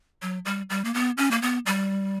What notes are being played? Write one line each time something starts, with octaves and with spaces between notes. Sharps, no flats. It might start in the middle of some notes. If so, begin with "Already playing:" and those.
F#3
G3
G3
A#3
B3
C#4
A#3
B3
G3